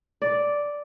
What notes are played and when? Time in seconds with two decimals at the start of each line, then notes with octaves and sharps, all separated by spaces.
0.22 D5